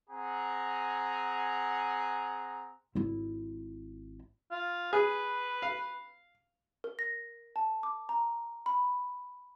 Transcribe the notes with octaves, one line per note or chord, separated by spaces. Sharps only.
C4 G#4 F#5 G#5 A#5
G#1 E4
F4
G#4 B4
F5
A#4
A#6
A5
D6
A#5
B5